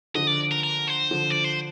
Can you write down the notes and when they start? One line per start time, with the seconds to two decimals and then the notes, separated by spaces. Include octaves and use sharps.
0.15 D3 F3 D#5
0.27 D5
0.51 A#4
0.64 A#4
0.87 C5
1.11 D3 F3
1.30 D5
1.44 C5